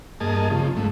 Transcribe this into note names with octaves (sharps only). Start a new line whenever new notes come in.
G2 A#3 G#4 D#5 A5
C#3 F3
G#2 A3